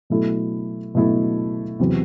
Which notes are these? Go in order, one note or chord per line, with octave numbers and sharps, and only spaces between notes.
B2 F#3 A3 E4 A4
B2 F#3 A3 E4 A4
E2 C3 F#3 C4